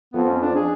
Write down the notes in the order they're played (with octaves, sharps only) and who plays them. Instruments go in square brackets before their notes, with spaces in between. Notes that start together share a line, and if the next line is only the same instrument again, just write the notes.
[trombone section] F2 [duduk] B3
[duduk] C#4
D4
G#4